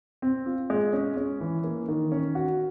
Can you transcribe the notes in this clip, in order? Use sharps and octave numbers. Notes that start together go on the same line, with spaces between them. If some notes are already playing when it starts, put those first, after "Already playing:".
C4
F4
G#3
C#4
C#4
E3
A#3
D#3
C#4
F#4